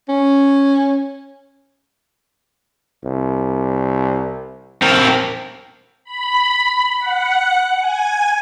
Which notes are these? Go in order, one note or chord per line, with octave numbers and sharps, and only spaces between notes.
C#4
C2
C4 A#4
B5
F#5
G#5